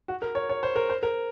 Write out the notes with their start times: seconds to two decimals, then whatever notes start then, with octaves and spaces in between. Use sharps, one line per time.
0.08 F#4
0.22 A#4
0.35 C#5
0.49 C#5
0.63 C5
0.76 A#4
0.90 C5
1.03 A#4